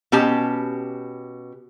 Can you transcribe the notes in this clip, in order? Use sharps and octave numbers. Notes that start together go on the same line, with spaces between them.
B2 C#4 G4 A5